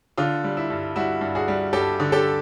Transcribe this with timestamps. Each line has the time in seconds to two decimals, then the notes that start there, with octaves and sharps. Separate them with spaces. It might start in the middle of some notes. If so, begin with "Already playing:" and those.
0.18 D3 F4
0.44 G3
0.57 E4
0.70 G2
0.96 G3 E4 F#4
1.21 G2
1.35 F#4 G#4
1.48 G3
1.73 G2 G4 A4
2.00 D3
2.12 G4 A4